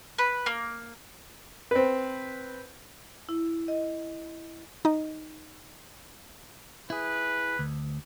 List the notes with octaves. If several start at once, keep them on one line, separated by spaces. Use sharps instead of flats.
B4
A#3
C4 B4
E4
D#5
D#4 D#5
E4 G#4 B4
D2